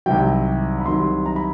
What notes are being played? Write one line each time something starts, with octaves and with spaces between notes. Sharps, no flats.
C2 C3 D#3 F#3 G5
B5
C2 C3 D#3 F#3 C6
A#5
B5